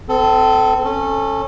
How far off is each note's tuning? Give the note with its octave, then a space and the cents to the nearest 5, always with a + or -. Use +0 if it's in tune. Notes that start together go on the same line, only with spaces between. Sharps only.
C4 -30 A4 +0
C#4 -20 A4 +0